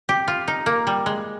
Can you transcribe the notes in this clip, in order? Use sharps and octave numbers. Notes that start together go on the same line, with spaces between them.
G4
F4
D#4
A#3
G3
G#3